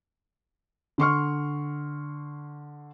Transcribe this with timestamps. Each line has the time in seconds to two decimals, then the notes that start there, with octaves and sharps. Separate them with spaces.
0.98 D3 C6 C#6 F6